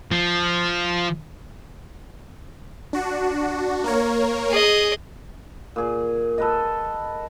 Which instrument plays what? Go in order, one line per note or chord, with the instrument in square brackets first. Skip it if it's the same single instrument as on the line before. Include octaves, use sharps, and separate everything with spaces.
[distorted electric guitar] F3
[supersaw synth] D4 F#4
A#3 A#4 C#5
[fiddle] G#4 D#5
[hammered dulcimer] A#2 G#4
A4 B4 D#5